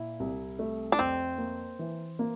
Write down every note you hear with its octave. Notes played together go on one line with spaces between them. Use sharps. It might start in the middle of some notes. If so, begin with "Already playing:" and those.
Already playing: A#2 E4
C2
A3
D4
F2 C4
A#3
E3
A#3